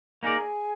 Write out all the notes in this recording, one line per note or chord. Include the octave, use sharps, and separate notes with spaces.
A#3 D#4 G#4 A#4 D5 G#5